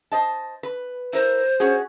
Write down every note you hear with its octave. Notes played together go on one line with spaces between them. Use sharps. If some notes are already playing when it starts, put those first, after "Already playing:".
C5 D#5 A5
B4
E4 A#4 C5
C#4 F#4 G#4